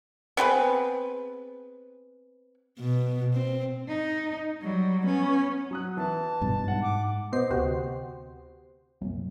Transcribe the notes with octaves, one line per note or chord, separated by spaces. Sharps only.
B3 C4 G#4 B4
B2
C4
D#4
F#3 G3
B3 C#4
F#3 D#6 F#6
E3 A5
G2 B2
G#2 F#5
D6
B2 B3 C5 D#5 C7
D2 C3 B3 F#4 G4 C5
C2 F#2 A#2